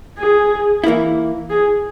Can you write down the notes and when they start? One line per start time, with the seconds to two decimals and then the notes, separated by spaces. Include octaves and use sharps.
0.18 G#4
0.84 E3 A#3 E4
1.50 G#4